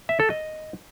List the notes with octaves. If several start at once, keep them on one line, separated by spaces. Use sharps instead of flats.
E5
A4
D#5